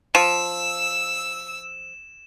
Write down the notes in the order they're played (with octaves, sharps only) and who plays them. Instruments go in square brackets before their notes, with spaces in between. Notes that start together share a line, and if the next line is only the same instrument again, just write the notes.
[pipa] F3 [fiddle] E6 [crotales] E7